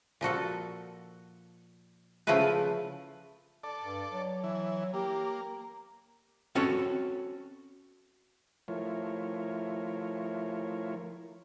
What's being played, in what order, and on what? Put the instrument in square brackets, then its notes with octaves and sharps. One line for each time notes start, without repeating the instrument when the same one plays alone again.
[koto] A#2 F3 F#4 A4
C#3 F3 A3 E4 F4 B4
[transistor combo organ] A4 D5
[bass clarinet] G2
F#3
[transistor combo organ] E3
[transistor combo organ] A#3 [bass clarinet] G4
[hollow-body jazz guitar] C4 C#4 F#4 A4 C#5
[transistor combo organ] F3 A3 E4 F4 A#4 C#5